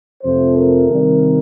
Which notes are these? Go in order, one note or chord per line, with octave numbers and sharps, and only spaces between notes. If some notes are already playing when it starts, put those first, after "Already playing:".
F2 C3 F3 A3 C5
A#4
C3 D#3 G3